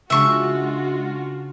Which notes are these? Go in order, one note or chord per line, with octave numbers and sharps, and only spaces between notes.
C#3 G#3 D4 F4 F#4 E5 C#6